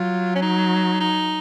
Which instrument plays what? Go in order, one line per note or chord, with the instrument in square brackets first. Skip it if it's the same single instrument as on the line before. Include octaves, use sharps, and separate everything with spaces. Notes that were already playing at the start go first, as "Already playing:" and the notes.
Already playing: [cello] F#3 [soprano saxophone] F4
[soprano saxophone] C#4
D#4
D#4